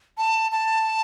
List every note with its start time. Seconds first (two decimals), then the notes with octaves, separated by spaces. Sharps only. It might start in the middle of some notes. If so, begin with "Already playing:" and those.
0.18 A5
0.52 A5